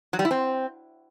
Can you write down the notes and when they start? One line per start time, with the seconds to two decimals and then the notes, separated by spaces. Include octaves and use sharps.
0.13 F#3
0.19 G3
0.25 E4
0.31 C4